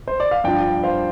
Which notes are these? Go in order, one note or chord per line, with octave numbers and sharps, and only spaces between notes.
C5
D5
F5
G2 F3 D4 D5 G5
C5 F5